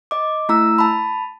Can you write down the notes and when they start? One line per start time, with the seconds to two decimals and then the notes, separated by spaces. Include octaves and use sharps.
0.11 D#5 D6
0.49 A3 E4 A#5 E6
0.78 A5 B5